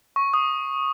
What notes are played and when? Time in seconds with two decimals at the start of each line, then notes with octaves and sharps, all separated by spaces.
0.16 C#6
0.34 D#6